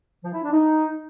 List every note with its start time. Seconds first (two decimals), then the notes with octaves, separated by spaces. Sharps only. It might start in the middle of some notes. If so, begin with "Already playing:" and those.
0.24 F3
0.33 E4
0.43 D4
0.52 D#4